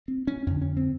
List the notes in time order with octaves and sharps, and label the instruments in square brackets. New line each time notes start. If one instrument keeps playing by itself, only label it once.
[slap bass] C4
C#4
F2 D3 C#4
C#4
C4